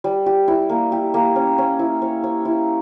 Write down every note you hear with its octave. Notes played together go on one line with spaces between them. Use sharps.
G3
G4
E4
A#3
G4
A#3
C#4
C#4
E4
C#5
C#5
E4